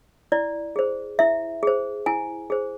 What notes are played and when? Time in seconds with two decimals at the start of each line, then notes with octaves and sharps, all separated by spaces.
0.32 E4 D5
0.76 G#4 C5
1.19 E4 E5
1.63 G#4 C5
2.06 E4 G#5
2.50 G#4 C5